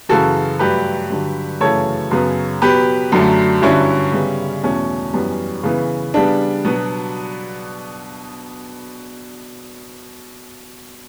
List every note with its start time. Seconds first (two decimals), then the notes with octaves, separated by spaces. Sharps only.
0.09 F#2 C#3 E3 F#4 A4
0.59 G2 F#3 A3 G4 B4
1.10 G2 D3 F#3
1.60 F#2 C#3 E3 A3 A4 C#5
2.11 F#2 C#3 F#3 B3
2.61 B2 F#3 B3 G4 B4
3.12 F#2 D3 F#3 A3
3.62 G2 D3 F#3 C#4 E4
4.12 C#3 G3 B3
4.63 E2 B2 A3 C#4
5.14 F#2 E3 G3 B3
5.63 C#3 E3 B3
6.14 C#3 G3 B3 D4
6.65 B2 F#3 B3